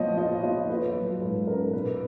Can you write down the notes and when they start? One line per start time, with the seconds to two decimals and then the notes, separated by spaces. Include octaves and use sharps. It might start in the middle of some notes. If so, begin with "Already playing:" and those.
Already playing: F3 B3 C#5 D#5
0.17 F4 D#5
0.43 F4 C#5
0.69 F4 B4
0.95 F#3 B4
1.21 G#2 B4
1.47 C#4 A#4
1.73 B2 B4